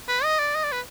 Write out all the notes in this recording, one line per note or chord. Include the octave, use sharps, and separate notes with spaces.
B4
D#5
D5
D#5
D5
B4